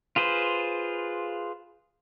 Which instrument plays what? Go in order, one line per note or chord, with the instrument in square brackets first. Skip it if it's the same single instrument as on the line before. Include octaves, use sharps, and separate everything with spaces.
[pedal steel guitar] F4 G#4 B4 C5